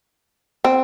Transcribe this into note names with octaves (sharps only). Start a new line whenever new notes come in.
C4